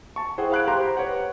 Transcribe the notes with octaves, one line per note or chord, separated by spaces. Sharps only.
A5 C#6
E4 G#4 C5 F#5 G5
F5 B5 F#6 G#6 D7
G4 C5 A#5 C6 D6 F#6
B4 C#5 F#5